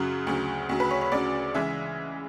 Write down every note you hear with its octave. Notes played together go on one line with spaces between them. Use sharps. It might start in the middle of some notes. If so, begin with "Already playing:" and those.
Already playing: F#2 C#3 F#3 F#4
D2 C#3 F#3
D2 C#3 F#3
B4
C#5
C#5
D2 C#3 F#3 D5
C#3 E3 G#3 E5